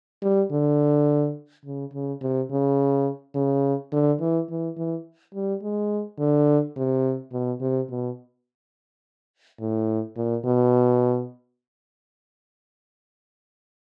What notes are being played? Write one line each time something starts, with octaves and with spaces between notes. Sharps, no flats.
G3
D3
C#3
C#3
C3
C#3
C#3
D3
E3
E3
E3
G3
G#3
D3
C3
B2
C3
B2
A2
A#2
B2